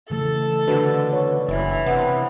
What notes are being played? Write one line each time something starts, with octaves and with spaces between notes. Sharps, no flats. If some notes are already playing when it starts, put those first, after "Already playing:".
C#3 E3 A3 A4
B2 D3 D4
C#5
F#1 E3
C3 B3